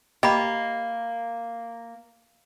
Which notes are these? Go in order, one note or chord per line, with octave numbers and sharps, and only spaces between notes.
A#3 G4 D#5 B5